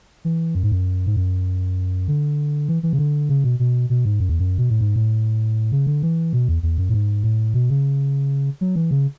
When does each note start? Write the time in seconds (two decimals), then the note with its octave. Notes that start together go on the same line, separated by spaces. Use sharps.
0.25 E3
0.55 F#2
0.63 G#2
0.72 F#2
1.06 G#2
1.16 F#2
2.08 D3
2.69 E3
2.83 E3
2.93 C#3
2.99 D3
3.29 C#3
3.44 B2
3.59 B2
3.90 B2
4.05 G#2
4.20 F#2
4.29 E2
4.39 F#2
4.58 B2
4.70 A2
4.81 G#2
4.96 A2
5.72 C#3
5.87 D3
6.02 E3
6.33 B2
6.49 E2
6.63 E2
6.78 F#2
6.89 A2
6.94 G#2
7.24 A2
7.54 B2
7.70 C#3
8.61 F#3
8.76 E3
8.91 C#3